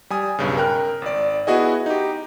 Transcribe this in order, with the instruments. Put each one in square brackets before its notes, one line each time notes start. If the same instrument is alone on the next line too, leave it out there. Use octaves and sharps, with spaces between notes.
[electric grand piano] G3 G#5 D#6
B1 G2 C#3
A#4 G5 F6 F#6
G#1 D5
B3 E4 F#4 G#4 D#5
D#4 G4